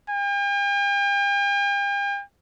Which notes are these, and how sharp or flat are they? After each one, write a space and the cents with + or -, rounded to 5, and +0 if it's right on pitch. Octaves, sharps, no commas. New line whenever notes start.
G5 +45